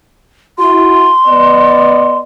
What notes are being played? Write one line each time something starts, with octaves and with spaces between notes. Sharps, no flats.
E4 F#4 C6
B3 D5 D#5